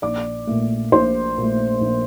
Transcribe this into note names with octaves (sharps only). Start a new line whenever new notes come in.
A#1 D5 D6
A#2 A3
A#1 C5 C6
A#2 A3
A#1